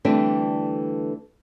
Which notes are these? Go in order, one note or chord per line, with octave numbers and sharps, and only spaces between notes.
D3 E3 G3 A3 C4 D4